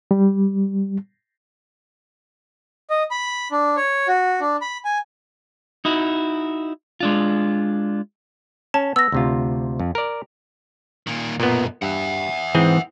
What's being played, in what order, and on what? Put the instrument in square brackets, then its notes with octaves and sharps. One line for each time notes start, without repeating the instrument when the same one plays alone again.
[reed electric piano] G3
[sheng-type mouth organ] D#5
B5
D4
C#5
F#4
D4
B5
G#5
[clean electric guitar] D#4 E4 F#4
G#3 D4 F4
[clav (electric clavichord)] C#4 [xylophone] A5
[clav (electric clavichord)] B3 [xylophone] E6 A#6
[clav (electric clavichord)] D2 C3 F4
F2
A#4 D5
[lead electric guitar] A#2 D#3
[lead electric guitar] B1 F#2 [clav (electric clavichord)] A#2 B3
[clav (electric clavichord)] G2 [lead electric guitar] E5 F#5
[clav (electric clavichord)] G#2 C4 G#4 [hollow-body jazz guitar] E3